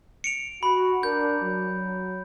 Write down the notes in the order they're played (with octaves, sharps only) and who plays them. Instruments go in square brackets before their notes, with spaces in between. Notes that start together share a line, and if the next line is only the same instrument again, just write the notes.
[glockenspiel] C#7 D7 F7
[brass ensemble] F#4 [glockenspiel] B5
[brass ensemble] D4 A#4 [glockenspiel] G6
[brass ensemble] F#3